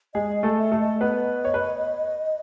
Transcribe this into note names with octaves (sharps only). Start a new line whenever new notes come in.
G#3 G#4 D#5
D#5
A3 A4
E5
A3 A4
D#5
B3 B4 D#5
C#5
B4